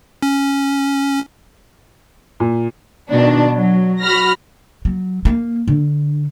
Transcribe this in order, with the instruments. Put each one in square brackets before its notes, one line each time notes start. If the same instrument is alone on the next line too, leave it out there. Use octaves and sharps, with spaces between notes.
[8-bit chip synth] C#4
[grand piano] A#2
[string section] B2 D#3 D4
F#3
F#4 B5 F6 A#6
[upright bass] F#3
A#3
D3